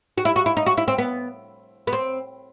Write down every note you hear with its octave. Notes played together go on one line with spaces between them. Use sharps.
F#4
E4
F#4
E4
D#4
F#4
E4
C4
B3
B3
C4